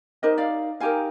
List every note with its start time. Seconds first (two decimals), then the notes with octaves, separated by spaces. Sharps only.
0.23 D#4 G4 A#4 C5 D#5
0.38 D5 F5
0.80 D#4 G4 A#4 F5 G#5